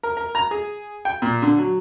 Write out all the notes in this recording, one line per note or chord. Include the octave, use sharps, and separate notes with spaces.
A#4
A#4
A#5
G#4
G5
A#2
D3
F#3